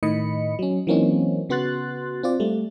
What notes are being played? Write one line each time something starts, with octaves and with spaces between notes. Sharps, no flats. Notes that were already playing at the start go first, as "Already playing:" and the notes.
A2 D#3 D#5 B5 C#7
F#3 C#4
E3 F#3 A#3 C4 C#4 D#4
C#3 B3 F#4 C6 F#6 A6
C4 F4 D5
G3 A3